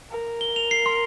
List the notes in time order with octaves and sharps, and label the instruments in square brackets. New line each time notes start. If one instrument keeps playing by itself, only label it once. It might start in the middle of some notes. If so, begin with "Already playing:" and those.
[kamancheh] A#4
[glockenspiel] G7
F7
C7
C6